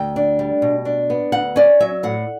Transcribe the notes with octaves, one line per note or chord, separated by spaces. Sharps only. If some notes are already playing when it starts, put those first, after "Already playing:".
Already playing: D2 G5
D4
G3
B2
D4
B3
D2 F#5
C#4 D5
F#3 E5
A2 F#5